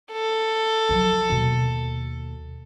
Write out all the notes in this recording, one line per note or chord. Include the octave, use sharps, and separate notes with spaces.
A4
F3 F#3
D#2 B2